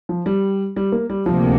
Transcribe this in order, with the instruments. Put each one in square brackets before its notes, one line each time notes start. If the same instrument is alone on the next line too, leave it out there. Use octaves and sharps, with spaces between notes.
[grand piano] F3
G3
G3
A#3
G3
[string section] D2 C3 A#3 [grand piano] F3